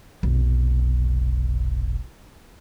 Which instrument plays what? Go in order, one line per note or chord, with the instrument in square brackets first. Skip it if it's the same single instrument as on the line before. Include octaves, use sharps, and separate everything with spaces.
[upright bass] F1 B1